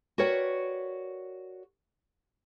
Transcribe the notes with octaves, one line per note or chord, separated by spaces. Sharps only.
F#4 A#4 B4 C#5 D5 G5